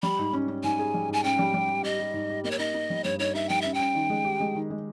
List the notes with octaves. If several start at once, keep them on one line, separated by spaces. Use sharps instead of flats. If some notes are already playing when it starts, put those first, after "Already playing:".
G3 B5
G#2
C#4
C#4
G#2 G#5
G#4
G3
G#2 G#5
C#4 G5
G3
G3
G4
G4 D#5
G4
G#2
G4
A#3 D#5
C#5
D#4 D#5
D#4
G3
G2 C#5
D#4 C#5
D#4 E5
G3 G5
C#4 E5
G5
C#4
D#3
G#3
G4
G#3
D#3
G#3